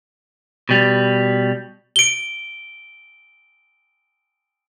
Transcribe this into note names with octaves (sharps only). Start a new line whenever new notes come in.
B2 G3
D7 G7